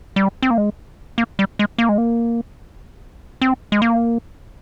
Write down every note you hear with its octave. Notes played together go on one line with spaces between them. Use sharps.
G3
C4
A#3
G#3
A#3
G3
G#3
A#3
G#3
A#3
C4
G#3
A#3